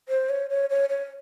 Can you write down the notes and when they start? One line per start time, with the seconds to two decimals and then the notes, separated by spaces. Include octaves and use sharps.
0.09 C5
0.29 C#5
0.50 C#5
0.70 C#5
0.89 C#5